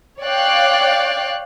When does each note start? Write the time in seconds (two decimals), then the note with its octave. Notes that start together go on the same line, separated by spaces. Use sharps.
0.21 C#5 D5 F5 G5 F#6